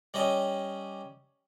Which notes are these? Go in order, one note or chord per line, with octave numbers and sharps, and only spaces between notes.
G3 C#4 D#5